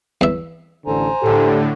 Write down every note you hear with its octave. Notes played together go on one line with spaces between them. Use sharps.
E2 E5
A1 D3 A4 C5 G#5 A#5
A2 D3 G4 A4